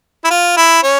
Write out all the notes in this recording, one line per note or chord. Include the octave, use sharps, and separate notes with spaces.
E4
F4
E4
C#4